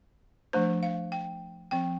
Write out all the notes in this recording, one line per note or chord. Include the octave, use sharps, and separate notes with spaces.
F3 A3 D4 C5
F5
G5
F3 C4 G5